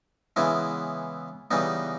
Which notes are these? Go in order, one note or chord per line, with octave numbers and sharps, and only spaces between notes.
C#3 E3 G#3 B3 E4
C#3 E3 G3 B3 D#4